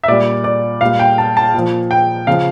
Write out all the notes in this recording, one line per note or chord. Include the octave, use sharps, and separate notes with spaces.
E5
A#2 G3 D5
D5
A#2 G3 F5
G5
A5
A5
A#2 F3
G5
C#3 F3 F5